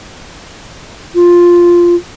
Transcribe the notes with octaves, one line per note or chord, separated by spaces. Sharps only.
F4